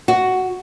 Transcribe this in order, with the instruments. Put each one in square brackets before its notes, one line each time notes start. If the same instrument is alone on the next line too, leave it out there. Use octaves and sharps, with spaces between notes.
[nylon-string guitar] F#4